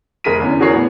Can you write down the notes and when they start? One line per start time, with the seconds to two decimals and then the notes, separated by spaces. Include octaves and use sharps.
0.24 F1 G#4 A#4 B6 D#7
0.40 E2 D3 C#4
0.60 E2 F#4 G#4 A#4 C#5 C7
0.73 A2 B3